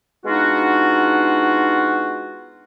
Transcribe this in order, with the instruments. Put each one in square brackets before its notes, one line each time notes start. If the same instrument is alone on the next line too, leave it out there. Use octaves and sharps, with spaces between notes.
[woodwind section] G#3 B3 D4 D#4 F4 F#4